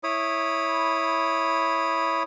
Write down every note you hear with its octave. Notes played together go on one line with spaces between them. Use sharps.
E4 C#5 B5 D#6